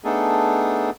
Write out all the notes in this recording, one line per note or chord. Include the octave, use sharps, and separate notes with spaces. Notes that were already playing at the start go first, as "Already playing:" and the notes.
A3 B3 D4 D#4 G#4 A4